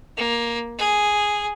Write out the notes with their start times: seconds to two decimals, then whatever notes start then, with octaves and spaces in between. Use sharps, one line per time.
0.17 A#3
0.78 G#4